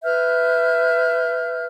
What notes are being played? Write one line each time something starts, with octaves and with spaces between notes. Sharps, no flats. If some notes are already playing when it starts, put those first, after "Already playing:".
B4 E5 F6 G6